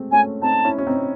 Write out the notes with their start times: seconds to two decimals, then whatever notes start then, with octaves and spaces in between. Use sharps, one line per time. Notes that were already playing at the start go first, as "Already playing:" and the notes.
Already playing: G#3 A3 C4
0.12 A3 C#4 G#5
0.42 C4 D#4 A5
0.64 C#4 E4
0.78 C#4
0.87 C4 D#4